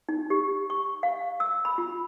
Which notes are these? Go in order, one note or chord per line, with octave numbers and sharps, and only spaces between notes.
D#4
G4
C#6
F5
E6
B5
F4